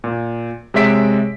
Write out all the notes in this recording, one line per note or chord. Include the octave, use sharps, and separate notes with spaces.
A#2
C3 G#3 C#5 E5 B6 D7